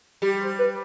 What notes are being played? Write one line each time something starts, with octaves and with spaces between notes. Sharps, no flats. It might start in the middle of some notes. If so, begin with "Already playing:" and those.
G3 G4
C5
B4